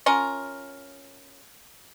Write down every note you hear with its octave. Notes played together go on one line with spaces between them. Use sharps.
C#4 F4 A#4